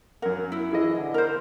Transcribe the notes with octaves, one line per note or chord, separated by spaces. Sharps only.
F#2 A#4 F#5
E4
E3 G#4 D#5
D3
A#4 C5 F6